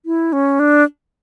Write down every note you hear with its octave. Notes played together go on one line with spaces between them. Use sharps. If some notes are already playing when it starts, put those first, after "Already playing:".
E4
C#4
D4